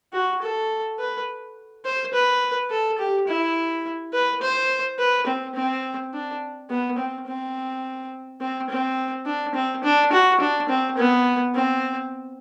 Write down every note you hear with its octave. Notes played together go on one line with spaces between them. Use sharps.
F#4
A4
B4
C5
B4
A4
G4
E4
B4
C5
B4
C4
C4
D4
B3
C4
C4
C4
C4
D4
C4
D4
F#4
D4
C4
B3
C4